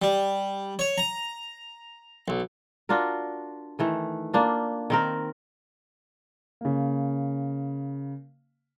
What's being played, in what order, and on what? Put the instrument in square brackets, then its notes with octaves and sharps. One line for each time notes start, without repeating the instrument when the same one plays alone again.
[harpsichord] G3
C#5
A#5
B1
[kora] D4 F4 F#4 A#4
D#3 E3 A3
A#3 D4 F4
D#3 C4 A#4
[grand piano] C#3 A#3